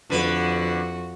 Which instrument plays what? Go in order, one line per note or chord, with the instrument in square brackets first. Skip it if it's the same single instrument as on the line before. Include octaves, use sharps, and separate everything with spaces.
[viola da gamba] F2 F#4 [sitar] D3 B4